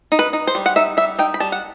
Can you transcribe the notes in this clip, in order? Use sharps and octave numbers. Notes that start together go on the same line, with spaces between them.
D#4
B4
D#4
C5
G3
F#5
D#4 E5
G3 E5
D#4 G5
B5
G3 A5
F#5